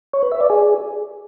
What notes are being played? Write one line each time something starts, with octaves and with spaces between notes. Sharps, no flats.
C#5
B4
E5
D5
G#4